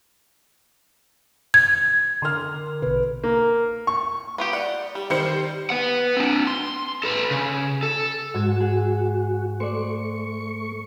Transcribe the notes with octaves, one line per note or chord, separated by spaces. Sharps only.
G#6
D3 A#4 C6 F6
A#1 B2 B4
A#3
C#6
B3 F4 G4
D5 F#5
G3 G4
D#3 G3 C5 C#7
B4 F#5
C4 D4
C6
A4 B4
C#3
A4
G#2 F#4 G#6 E7
G#4
A3 C5 D5 C#6